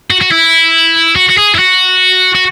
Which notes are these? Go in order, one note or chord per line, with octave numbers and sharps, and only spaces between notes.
F#4
F#4
E4
F#4
F#4
G#4
E4
F#4
F#4